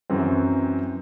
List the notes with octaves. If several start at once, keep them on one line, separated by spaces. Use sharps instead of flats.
F#2 E3 F#3 C4